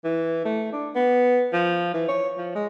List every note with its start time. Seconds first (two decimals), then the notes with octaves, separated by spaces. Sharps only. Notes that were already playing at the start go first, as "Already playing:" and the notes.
0.04 E3
0.45 A3
0.73 D4
0.95 B3
1.53 F3
1.94 E3
2.09 C#5
2.38 F3
2.55 G#3